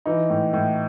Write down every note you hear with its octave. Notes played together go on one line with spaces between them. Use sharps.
E3 D#4
A2
A2